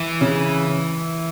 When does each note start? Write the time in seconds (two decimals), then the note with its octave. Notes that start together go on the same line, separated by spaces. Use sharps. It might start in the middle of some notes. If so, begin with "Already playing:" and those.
Already playing: E3
0.21 C#3